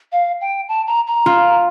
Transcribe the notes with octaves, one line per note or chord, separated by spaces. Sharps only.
F5
G5
A5
A#5
A#5
F4